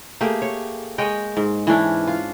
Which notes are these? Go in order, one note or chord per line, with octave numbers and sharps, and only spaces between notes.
A3 A#3 G4 G#4
C#5
G#3 C#5 D#5 G5
G#2
E3 C#4 D4 E4
F4